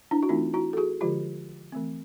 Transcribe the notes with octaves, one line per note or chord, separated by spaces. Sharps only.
D4 E4
F#4
E3 A3 C4 D#4 F4
E4 F#4
A4
F#4 G#4
D3 F3 G#3 F4 G4
E3 A3 C4